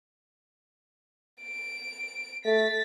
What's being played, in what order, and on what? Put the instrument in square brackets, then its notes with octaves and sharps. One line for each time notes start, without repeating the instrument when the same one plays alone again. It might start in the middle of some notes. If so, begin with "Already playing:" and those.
[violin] D7
[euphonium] A3 [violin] A6 B6